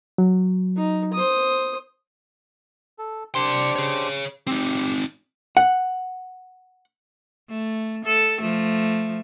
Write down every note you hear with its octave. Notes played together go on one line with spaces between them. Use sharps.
F#3
D#4
C5 D#6
A4
D4 G4 C5 D5 C6
G#4 C#5
C4 D#4 G4
F#5
A3
A4
F3 A3